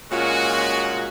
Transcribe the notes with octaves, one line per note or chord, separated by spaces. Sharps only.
A#2 G#3 C#4 F4 F#4